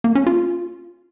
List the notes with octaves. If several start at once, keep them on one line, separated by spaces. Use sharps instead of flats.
A#3
C#4
F4